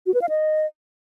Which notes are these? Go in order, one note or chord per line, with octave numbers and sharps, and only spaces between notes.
F#4
B4
F5
D#5